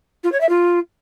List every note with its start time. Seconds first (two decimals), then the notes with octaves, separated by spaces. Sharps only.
0.24 F4
0.32 C#5
0.41 E5
0.49 F4